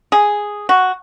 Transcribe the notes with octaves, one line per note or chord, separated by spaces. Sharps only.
G#4
F#4